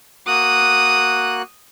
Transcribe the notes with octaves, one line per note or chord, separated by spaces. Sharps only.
A#3 F#4 D#6 F#6